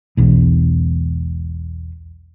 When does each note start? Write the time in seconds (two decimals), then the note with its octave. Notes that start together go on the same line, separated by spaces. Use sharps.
0.17 E1 B1 E2